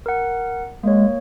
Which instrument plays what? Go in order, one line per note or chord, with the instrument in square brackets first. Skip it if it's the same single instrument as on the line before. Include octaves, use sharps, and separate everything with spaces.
[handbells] A#4 F#5
[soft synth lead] G#3 [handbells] A#3 C#5